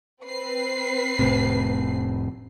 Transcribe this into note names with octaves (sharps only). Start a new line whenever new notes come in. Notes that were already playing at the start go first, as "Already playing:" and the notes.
C4 B4 C7
F1 A2 C3